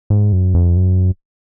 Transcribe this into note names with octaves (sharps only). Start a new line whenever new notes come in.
G#2
F#2
F2
F#2